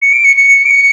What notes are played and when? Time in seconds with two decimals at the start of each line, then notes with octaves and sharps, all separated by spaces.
0.02 C#7
0.13 D7
0.25 C#7
0.36 C#7
0.66 D7
0.71 C#7